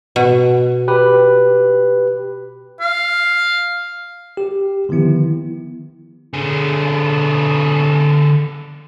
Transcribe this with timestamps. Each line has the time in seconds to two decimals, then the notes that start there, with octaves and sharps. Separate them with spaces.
0.16 B2
0.88 G4 B4
2.81 F5
4.37 G4
4.89 D3 D#3 F3 B3 E4
6.33 D3 G#4